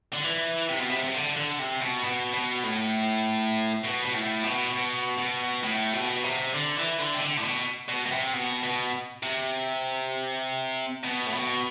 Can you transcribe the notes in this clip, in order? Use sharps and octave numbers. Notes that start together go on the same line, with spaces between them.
D3
E3
C3
B2
C3
C3
D3
D3
C3
B2
B2
B2
A2
B2
B2
A2
B2
B2
B2
A2
B2
C3
D3
E3
D3
C3
D3
A2
B2
B2
B2
C3
B2
B2
C3
B2
A2
B2